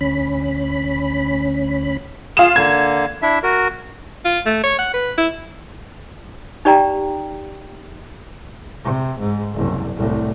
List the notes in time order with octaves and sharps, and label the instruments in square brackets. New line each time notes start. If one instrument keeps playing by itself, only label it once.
[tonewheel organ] D2 C#4 B5
[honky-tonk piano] F4 E7 [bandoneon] G#4
[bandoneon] D3 A#3 [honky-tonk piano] G#6
[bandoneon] D4 E4 E5
F#4 A#4
[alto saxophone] F4
A3
C#5
F#5
B4
E4
[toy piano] D#4 G4 D5 G5 A#5
[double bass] C3
G#2
F#1 C2
C2 A2